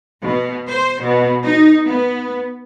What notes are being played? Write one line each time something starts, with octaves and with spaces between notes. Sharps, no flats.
B2
C5
B2
D#4
B3